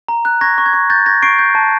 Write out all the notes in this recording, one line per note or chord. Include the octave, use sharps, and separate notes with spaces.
A#5
F#6
C#6 G#6 A#6
C#6
G#6
C#6
C#6 G6 A6
C#6 G#6 A#6
C#6 C7 D7
G6
A5